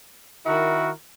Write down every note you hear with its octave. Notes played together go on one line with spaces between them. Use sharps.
D#3 E4 F#4 A#4